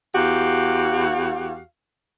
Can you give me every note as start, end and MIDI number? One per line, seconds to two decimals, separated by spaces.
0.15 1.61 40
0.15 1.61 66
0.15 1.61 67
0.15 1.61 77